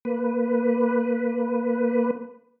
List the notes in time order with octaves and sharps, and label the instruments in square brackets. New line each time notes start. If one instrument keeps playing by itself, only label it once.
[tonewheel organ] A#3 B4